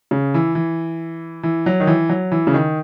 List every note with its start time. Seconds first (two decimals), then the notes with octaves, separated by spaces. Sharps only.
0.11 C#3
0.34 E3
0.55 E3
1.43 E3
1.66 F#3
1.80 D#3
1.87 E3
2.09 F#3
2.32 E3
2.47 C#3
2.54 D#3